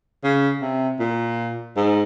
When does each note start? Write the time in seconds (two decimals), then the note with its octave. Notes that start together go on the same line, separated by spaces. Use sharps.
0.24 C#3
0.62 C3
1.00 A#2
1.76 G#2